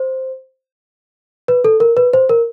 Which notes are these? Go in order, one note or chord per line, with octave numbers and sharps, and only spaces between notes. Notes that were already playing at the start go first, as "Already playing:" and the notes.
Already playing: C5
B4
A4
A#4
B4
C5
A#4